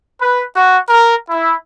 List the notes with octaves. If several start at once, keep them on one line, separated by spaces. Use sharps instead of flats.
B4
F#4
A#4
E4